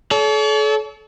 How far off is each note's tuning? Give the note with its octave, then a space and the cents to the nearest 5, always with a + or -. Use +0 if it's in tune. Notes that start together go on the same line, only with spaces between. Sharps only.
A4 -40 C#5 +45